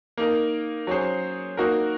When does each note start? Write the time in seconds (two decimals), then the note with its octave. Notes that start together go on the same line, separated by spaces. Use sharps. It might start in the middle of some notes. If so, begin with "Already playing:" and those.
0.18 A#3 D#4 A#4
0.87 F#3 C#4 G#4 C5
1.57 A#3 D#4 F#4 A#4